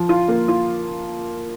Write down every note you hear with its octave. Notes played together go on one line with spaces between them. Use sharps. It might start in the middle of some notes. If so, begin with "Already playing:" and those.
Already playing: F3
F4
A#3
F4